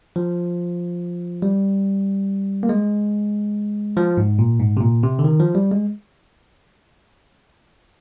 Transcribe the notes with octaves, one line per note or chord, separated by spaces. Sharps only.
F3
G3
A#3
G#3
F3
G#2
A#2
G#2
C3
A#2
C3
D3
D#3
F3
G3
G#3